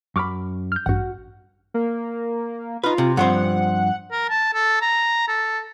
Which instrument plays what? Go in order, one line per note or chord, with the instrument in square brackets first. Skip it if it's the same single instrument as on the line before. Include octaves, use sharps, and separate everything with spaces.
[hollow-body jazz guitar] F#2 B5 [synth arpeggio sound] C#6 D6 F6
[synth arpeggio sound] F6 G6
[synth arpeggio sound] A1 G2 [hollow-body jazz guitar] F#4 F#5
[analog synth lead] A#3
[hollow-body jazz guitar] D#4 B4 [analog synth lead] F4
[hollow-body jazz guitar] C3
[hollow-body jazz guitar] G2 F3 C4 [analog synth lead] F#5
[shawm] A#4
A5
A4
A#5
A4